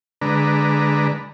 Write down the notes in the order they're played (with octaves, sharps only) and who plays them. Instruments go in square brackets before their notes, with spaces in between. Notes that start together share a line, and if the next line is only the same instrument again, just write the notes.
[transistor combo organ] D3 G#3 D4 B4 A#5